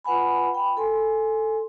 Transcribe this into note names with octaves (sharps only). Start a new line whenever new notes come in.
F4 B4 F#5 G#5 B5
G5 B5
A4 G#5 C6